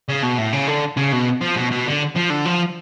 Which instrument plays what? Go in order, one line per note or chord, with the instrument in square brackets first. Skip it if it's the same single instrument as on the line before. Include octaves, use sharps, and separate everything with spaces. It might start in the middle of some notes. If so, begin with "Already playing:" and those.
[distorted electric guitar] C#3
B2
A2
C#3
D3
C#3
B2
F3
B2
B2
D3
F3
D3
F3